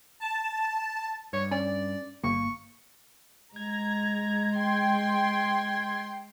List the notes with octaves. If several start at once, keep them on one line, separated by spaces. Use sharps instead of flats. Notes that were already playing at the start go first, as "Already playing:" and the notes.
A5
G2 C#5
C#4 D5
G1 A#3 C#6
G#3 A#5 G#6
G5 C6